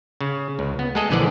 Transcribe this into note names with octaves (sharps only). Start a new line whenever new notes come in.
C#3
C#2
B3
G#3 A3 G#4 A4 D#5
A#1 D3 E3 D5 F#5